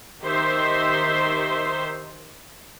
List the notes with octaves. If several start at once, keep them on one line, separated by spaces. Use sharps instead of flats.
D#3 D#4 G4 C5 E5 C6